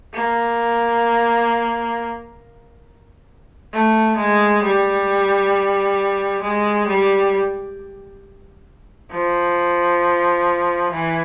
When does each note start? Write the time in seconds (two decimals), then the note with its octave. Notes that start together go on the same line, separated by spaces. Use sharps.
0.14 A#3
3.73 A3
4.17 G#3
4.63 G3
6.42 G#3
6.87 G3
9.12 F3
10.92 E3